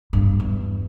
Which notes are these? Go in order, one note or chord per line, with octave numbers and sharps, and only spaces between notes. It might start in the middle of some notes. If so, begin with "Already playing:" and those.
G2
E2